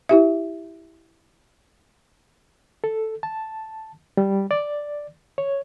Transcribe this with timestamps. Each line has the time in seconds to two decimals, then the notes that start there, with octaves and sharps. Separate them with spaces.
0.09 E4 G4 E5
2.84 A4
3.23 A5
4.17 G3
4.51 D5
5.38 C#5